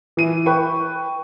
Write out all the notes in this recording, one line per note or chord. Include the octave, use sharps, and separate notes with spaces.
E3 D#7
B4 G5 C#6